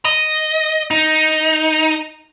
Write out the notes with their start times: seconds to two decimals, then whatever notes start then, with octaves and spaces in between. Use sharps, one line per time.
0.05 D#5
0.91 D#4